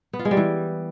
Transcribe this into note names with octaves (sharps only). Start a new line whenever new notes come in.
B3
F4
G#3
G3
E3